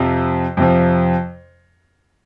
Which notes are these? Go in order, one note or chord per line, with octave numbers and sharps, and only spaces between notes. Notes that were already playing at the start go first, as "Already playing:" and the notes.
Already playing: F2 C3 F3
F2 C3 F3